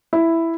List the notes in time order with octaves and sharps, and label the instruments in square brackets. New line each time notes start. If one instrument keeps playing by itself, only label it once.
[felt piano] E4